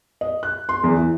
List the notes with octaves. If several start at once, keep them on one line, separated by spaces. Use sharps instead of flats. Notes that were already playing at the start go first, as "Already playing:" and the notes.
D#5
F#6
C6
E2
E3